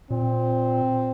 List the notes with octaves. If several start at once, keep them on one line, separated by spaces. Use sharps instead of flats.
A#2 C4